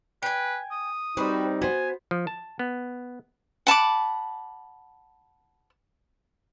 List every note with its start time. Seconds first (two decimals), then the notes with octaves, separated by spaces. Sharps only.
0.23 B4 G5 G#5
0.71 D#6
1.17 G3 C4 D#4 F#4 B4 C5
1.62 B3 F#4 C5 G#5
2.11 F3
2.27 A5
2.59 B3
3.67 F#5 A5 B5 D6